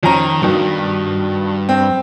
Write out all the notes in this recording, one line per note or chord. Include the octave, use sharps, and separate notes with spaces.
F2 D#3 C#4 A#5
C2 G2 B2 D#3
C4